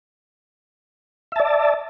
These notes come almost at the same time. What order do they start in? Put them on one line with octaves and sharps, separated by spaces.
E5 A5 D5